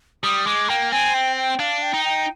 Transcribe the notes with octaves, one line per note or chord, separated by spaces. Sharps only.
G3 D#6
G#3 D6
A#3 G5
C4 G#5
G5
G5
D4 F5
G5
D#4
G5